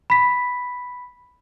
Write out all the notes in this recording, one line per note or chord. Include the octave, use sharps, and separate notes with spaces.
B5 B6